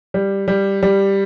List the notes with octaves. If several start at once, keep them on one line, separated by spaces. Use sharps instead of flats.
G3
G3
G3